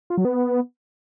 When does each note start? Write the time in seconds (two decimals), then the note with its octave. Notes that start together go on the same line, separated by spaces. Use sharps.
0.10 F4
0.17 F#3
0.25 B3